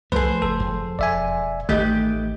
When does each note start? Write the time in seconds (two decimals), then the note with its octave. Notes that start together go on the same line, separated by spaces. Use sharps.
0.12 C2 F3 A3 G#4 A4 B4 C5
0.42 F#1 A4
0.60 F2
0.99 E1 D5 E5 G#5
1.69 A1 D#3 A3 D#4 G4 B4